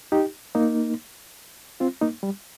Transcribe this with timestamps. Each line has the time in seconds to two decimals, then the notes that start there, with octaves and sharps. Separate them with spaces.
0.12 D#4 G4
0.55 A#3 D#4
1.80 C4 F4
2.01 A#3 D#4
2.23 G3